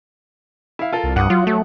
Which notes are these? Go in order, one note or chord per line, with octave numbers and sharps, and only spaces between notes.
E4 F5
F4 A4 A#4
C2
G2 F#5 D6 D#6
F#3 F4
F#3 A3